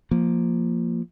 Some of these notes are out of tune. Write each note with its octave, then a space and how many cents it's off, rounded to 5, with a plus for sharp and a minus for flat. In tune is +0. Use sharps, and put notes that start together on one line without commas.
F3 +0 A#3 +0